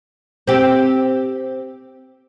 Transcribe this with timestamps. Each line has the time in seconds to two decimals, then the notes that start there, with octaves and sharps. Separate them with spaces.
0.47 C4 G4